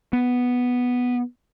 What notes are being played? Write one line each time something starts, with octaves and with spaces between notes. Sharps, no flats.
B3